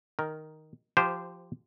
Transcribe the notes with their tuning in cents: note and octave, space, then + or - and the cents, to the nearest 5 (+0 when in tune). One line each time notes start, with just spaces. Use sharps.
D#3 +0 A#4 +0
F3 +0 G4 +0 C5 -20